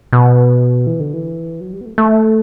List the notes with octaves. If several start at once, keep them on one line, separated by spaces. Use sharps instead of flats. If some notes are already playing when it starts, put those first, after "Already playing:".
B2
E3
D3
E3
F#3
G3
B3
A3
A3